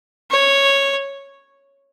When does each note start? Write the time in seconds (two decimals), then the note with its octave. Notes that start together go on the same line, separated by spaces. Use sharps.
0.31 C#5